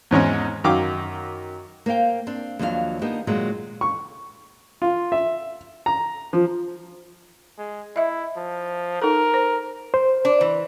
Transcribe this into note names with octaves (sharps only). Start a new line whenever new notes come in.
E2 G#2 G#3 C#4
F#2 D#3 F5 G5 D6
A#3 C5 F5 G5
C4 D4
D#2 F3 F#3 D4 A4 F5
A#3 B3 D4 D#4 G4
A#2 D#3 F#3 G#3
C#6
F4
E5
A#5
F3
G#3
E4 D#5 E5
F3
D#4 A4 A#4
C5
C5
D4
E3